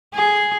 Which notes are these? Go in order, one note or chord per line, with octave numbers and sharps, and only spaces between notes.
G#4